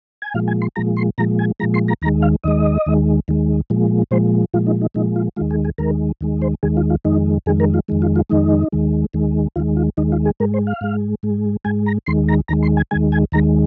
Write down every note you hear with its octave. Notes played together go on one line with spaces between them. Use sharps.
G#5
A#2 F3 G#3 F5
G#5
C6
A#2 F3 G#3 A#5
C6
A#2 F3 G#3 A#5
G#5
A#2 F3 G#3 A#5
C6
A#5
D#2 D#3 G#3 A#5
F5
D#2 D#3 G#3 D#5
D#2 D#3 G#3
D#2 D#3 G#3
A#2 F3 G#3
A#2 F3 G#3 C5
A#2 F3 G#3 F4
D#4
D#4
A#2 F3 G#3 D#4
F4
D#2 D#3 G#3 F4
G#4
G#4
D#2 D#3 G#3 A#4
D#2 D#3 G#3
C5
D#2 D#3 G#3 G#4
F4
F4
F2 D#3 G#3 D#4
F2 D#3 G#3 G#4
A#4
F4
F2 D#3 G#3
F4
F4
F2 D#3 G#3 D#4
D#2 D#3 G#3
D#2 D#3 G#3
D#2 D#3 G#3 F4
F4
D#2 D#3 G#3 D#4
F4
G#4
G#2 G#3 A#4
C5
F5
G#2 G#3
G#2 G#3
G#2 G#3 G#5
A#5
D#2 D#3 G#3 C6
A#5
D#2 D#3 G#3 A#5
C6
G#5
D#2 D#3 G#3 G#5
G#5
D#2 D#3 G#3 A#5